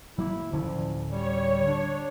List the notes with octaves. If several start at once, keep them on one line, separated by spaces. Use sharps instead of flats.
F#3 A#3 B3 E4
D1 D3 F3 C#4
G3 C#5
D4